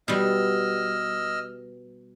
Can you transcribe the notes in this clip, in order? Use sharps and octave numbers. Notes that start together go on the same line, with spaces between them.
B2 G3 D#5 E6 F6